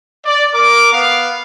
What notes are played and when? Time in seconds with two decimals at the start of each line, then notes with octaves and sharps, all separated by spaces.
0.25 D5
0.54 A#4 D6
0.93 B3 F5